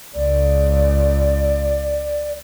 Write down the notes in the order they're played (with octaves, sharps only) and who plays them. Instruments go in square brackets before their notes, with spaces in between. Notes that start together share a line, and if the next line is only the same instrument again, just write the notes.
[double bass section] C#2 [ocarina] D5